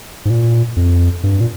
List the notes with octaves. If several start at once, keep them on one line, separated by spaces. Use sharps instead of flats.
G#2
A#2
F2
G2
A#2